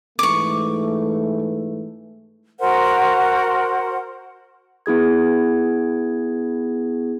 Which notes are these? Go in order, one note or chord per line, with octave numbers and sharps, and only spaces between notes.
G#2 E3 A3 C#6 D6
F#4 A#4 C5 F#5
B3 E4 G#4 G#6